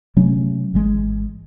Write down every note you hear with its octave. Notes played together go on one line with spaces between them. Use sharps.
C3 F#3 A3 C#4
G#1 E3 G#3